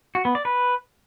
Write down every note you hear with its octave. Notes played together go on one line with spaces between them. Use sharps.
F#4
B3
D5
B4